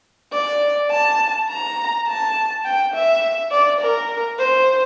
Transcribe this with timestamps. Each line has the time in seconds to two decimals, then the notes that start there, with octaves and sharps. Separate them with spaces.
0.33 D5
0.91 A5
1.49 A#5
2.08 A5
2.65 G5
2.94 E5
3.52 D5
3.81 A#4
4.39 C5